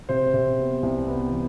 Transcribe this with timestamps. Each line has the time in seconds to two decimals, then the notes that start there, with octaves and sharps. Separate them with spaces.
0.09 C3 C5
0.33 C3
0.58 B3
0.83 C2
1.07 B3
1.31 E3